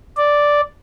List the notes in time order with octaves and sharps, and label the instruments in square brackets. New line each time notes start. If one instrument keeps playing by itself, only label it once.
[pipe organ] D5